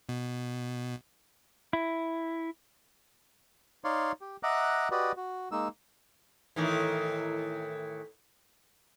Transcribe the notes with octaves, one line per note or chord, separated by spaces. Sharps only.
B2
E4
D#4 C#5 D5 F5 C6
G4
D#5 E5 F#5 A#5 D6 F#6
F#4 G4 B4 D5 D#5
F#4
G#3 A#3 D#4 E6
A2 D#3 E3